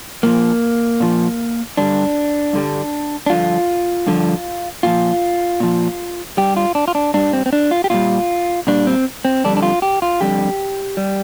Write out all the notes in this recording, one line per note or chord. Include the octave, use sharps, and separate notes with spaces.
A#2 F3 A#3
A#2 F3
G2 D3 G3 D4
G2 D3 G3
D4
G2 D3 F3 F4
G2 D3 F3
A#2 F3 F4
A#2 F3
G2 G3 G4
F4
D4
F4
D4
G2 G3 D4
C4
C4
D4
F4
G4
A#2 G3 F4
A#2 G3 D4
C4
C4
F2 D3 G3 D4
D4
F4
G4
F4
F2 D3 G3 G4
G3